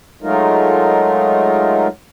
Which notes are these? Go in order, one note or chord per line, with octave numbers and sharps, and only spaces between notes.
F#3 G#3 A3 D#4 F4 A#4